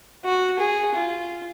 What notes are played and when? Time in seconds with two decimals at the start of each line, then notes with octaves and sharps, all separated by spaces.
0.25 F#4
0.59 G#4
0.95 F4